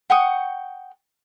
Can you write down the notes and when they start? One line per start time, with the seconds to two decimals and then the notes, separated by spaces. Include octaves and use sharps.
0.10 F#5 G5 C#6 D#6